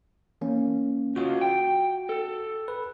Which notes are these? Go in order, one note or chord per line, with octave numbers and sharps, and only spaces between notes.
E3 A#3 C#4
C#3 F4 F#4
G5
A4
B4